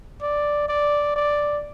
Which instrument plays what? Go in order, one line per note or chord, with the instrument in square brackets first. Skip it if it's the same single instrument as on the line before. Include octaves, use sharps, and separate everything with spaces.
[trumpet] D5
D5
D5